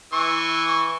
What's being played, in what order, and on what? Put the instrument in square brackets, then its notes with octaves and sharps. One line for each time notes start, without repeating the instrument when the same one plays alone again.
[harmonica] E3 C#6